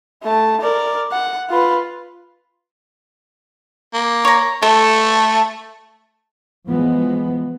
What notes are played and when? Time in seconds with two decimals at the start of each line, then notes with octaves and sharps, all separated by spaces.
0.23 A3 A5
0.61 A#4 D5
1.12 F#5
1.50 F4 B4
3.94 A#3
4.25 C#5 A#5
4.62 A3 A4
6.67 E3 F3 G#3 B3